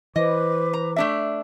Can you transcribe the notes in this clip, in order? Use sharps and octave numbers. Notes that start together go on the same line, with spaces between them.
E3 B4 C5 D#5 D6
A#5
A3 D4 E5